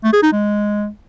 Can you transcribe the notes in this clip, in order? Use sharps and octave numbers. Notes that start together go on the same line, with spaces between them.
A3
G#4
D#4
G#3